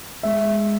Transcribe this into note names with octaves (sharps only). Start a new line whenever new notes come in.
G#3 E5